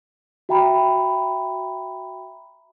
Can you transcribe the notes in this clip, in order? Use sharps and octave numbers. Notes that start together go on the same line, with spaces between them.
F#4 E5 G5 A#5 B5